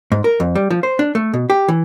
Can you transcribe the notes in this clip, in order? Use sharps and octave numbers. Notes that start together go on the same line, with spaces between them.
G#2
A#4
F2
G3
F3
C5
D4
A3
B2
G4
E3